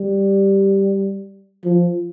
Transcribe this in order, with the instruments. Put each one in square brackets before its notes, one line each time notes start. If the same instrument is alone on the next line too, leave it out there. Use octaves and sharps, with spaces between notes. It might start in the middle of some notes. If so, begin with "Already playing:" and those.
Already playing: [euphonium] G3
F3